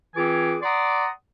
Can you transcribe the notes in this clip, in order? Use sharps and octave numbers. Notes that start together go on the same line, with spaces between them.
E3 C4 F4 G#4 G#5 D6
D5 F#5 A#5 C6 D6 D#6